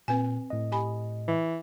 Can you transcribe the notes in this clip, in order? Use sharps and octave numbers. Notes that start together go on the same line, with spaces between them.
A#2 C4 B4 G#5
A2 D#5
G4 G#5 B5
E3